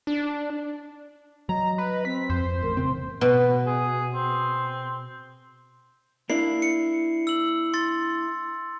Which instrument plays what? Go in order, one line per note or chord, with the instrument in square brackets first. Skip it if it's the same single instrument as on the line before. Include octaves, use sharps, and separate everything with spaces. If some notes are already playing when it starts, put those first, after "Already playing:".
[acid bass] D4
[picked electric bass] F#3 [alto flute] D#5 [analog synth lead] A#5
[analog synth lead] B4
[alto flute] C4 [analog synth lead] B6
[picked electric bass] F2 [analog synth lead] C5
[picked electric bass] A1 [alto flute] A#4
[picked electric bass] E1 C#3 C4 [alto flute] C6
[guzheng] B2 [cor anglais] B4
[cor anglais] G#4
C4
[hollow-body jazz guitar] A#3 D4 E4 [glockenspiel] C7
[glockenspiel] C#7
E6 F#7
C6 A6